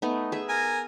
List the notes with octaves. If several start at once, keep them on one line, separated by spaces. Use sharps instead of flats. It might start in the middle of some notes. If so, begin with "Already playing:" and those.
A3 B3 D#4
G#4 E5
A#4 G#5